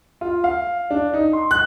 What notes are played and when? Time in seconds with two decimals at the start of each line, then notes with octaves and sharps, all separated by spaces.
0.21 F4
0.44 F5
0.90 D4
1.14 D#4
1.33 C6
1.51 F#6